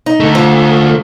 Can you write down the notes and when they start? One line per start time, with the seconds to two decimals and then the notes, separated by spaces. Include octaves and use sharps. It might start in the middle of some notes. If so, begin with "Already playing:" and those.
0.06 D#4
0.20 D3 A3
0.35 F3